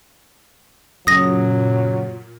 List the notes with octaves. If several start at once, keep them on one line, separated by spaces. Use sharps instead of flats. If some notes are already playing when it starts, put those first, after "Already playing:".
F#2 A#2 C#3 F#3 D#6 A#6